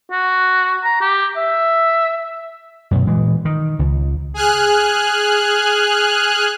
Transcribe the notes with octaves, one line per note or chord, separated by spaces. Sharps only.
F#4
A#5
G4
E5
F#2 B2
A#2 E3 G#3
D#3
C#2
G#4 G#5 F6 F#6